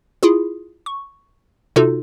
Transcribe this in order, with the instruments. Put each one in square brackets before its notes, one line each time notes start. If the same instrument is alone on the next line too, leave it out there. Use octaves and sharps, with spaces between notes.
[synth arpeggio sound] E4 F4 G#4
C#6
C3 D#4 F4 F#4 A4